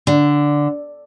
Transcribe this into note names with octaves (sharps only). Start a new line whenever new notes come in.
D3